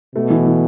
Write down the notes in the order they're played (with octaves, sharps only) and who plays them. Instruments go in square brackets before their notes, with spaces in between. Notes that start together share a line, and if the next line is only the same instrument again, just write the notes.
[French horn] B2 [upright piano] A3
[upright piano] E3
E3